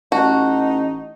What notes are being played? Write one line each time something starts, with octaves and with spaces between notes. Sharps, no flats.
A1 D#4 F#4 A5 C#6